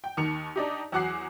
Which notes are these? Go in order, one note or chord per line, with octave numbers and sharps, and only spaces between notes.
G5
D#2 D#3 C#7 F7
D4 D#4 G4
E2 F#3 F#5 D6 F#6 C7